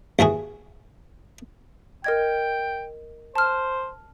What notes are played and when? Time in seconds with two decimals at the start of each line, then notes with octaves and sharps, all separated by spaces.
0.19 D#2 E3 F#4 G#4
2.04 A#4 D#5 G5 G#6
3.36 C5 A5 F6